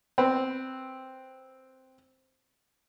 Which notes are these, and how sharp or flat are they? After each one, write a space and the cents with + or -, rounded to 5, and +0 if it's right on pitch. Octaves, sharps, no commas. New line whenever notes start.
C4 +0 B4 +0